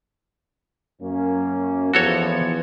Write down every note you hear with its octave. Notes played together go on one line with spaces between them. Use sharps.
F#2 A#3 C#4
E2 F3 B3 F#4 A4 C#5